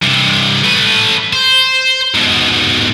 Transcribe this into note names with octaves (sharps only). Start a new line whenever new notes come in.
G2 C3
A3 B4
C5
G#2 B2